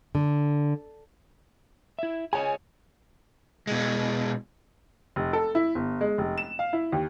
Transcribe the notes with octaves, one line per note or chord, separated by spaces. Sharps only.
D3
E4 E5
G#4 C#5 D#5 G#5
B2 G#3
F1
A4
E4
G1
G#3
F1
E7
F5
E4
D#2